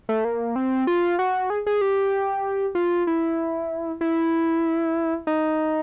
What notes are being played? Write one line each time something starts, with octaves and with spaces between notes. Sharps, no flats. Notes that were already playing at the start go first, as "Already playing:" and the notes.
A3
A#3
C4
F4
F#4
G#4
G#4
G4
F4
E4
E4
D#4